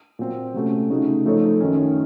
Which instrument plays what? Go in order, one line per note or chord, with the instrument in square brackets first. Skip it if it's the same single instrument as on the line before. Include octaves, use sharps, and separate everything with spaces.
[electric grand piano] A#2 F#3 C4
C3 F#3 A3 C#4
C#3 A3 D#4 F#4
F3 A3 D#4 A4 C#5
F#2 D#3 A3 C#4